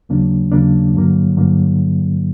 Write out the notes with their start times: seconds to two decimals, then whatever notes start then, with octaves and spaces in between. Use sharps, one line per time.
0.09 D#2 C#3 F#3 A#3 D4
0.52 D#2 C#3 F#3 A#3 D4
0.94 G2 D3 F#3 A#3
1.37 G2 D3 F#3 A#3